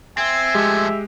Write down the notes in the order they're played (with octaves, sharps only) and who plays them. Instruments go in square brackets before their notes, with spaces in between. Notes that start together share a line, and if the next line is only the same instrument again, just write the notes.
[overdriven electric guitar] C4 [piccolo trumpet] E5 [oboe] G#5
[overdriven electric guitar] F3 A3 [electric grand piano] G#3 G4